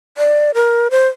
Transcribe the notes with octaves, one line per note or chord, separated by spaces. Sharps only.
D5
A#4
C5